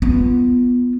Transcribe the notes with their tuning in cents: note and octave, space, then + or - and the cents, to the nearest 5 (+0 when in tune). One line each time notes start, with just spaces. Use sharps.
B3 +0 F4 -10